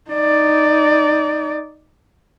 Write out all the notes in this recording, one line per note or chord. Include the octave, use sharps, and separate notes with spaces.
D#4 D5